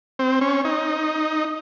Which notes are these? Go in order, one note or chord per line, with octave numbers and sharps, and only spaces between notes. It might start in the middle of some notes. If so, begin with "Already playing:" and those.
C4
C#4
D#4